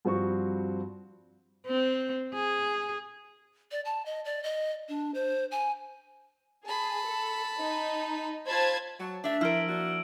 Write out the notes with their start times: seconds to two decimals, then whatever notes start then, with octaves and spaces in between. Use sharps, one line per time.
0.05 G2 F3 G3 C4 F#4 C#6
1.66 C4
2.34 G#4
3.71 D5
3.85 A5
4.06 D#5
4.25 D5
4.44 D#5
4.89 D4
5.14 C5
5.51 G#5
6.66 G#4 A5 B5
7.06 A4
7.59 D#4
8.46 F4 C5 A5 B5 G#6
9.00 F#3 A5
9.24 A3 D4 E5
9.41 F3 E4 A#4 E6 F6 D7
9.69 A#3 D4 F#4